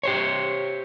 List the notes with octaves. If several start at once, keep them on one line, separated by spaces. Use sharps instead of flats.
G4 C5 C#5